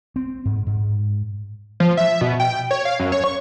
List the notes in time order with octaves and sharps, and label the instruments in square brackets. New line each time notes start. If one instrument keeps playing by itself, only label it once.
[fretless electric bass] C4
G#2
G#2
[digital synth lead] F3
E5
B2
G5
C#5
F5
F#2
C#5
C#6